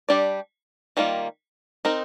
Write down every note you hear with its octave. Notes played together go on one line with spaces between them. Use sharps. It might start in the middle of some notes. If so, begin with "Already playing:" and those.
G3 D4 G4 D5
D#3 G3 A#3 F4
C4 D#4 A#4